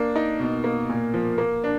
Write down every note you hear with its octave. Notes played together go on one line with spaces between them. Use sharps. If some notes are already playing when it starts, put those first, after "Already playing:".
Already playing: A#3 D4
D#4
B2
A#3
A#2
F3
A#3
D4